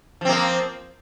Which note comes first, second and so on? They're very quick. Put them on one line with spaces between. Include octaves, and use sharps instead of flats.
F3 C4 A#3